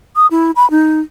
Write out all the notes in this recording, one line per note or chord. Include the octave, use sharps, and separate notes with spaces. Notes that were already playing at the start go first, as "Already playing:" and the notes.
D#6
E4
B5
D#4